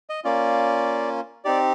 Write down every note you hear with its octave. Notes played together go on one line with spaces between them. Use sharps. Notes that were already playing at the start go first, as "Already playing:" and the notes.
D#5
A#3 C#4 F4 D5
C4 D#4 G4 D5